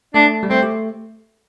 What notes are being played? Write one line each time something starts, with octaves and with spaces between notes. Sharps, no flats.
A3 D4
G3
A3 C4
G4